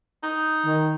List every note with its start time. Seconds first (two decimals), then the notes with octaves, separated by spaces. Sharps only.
0.23 D#4
0.65 D#3